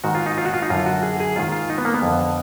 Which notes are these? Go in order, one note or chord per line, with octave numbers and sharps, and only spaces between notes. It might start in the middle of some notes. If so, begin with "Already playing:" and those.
G#2 D#3 F#4
F4
D#4
F4
F#4
F4
D#4
F#2 D3 F4
F#4
G#4
G#4
G#2 D#3 F4
F4
D#4
B3
A#3
B3
F2 D3